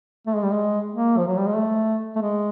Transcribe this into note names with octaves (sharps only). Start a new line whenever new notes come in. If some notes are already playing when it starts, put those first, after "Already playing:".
A3
G#3
G3
G#3
A#3
F3
F#3
G3
G#3
A3
A3
G#3